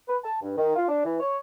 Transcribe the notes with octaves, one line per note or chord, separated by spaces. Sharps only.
B4
A5
G2
D#3
F4
D4
E3
C#5